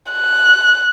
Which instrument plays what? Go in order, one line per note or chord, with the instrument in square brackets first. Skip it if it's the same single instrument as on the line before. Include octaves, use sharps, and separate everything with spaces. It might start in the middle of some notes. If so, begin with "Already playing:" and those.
[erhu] F#6